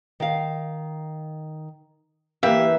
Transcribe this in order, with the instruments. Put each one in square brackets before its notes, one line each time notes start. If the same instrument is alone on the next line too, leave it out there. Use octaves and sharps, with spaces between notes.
[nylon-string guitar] D#3 F5
[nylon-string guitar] E3 [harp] A#3 B4 [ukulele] G4 F5 [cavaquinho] E5